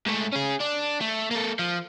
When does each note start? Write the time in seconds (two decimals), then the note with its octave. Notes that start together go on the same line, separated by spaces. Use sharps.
0.06 G#2 A3
0.33 C#4 G#4
0.61 D4
1.01 A3
1.31 A#3 A4
1.59 F3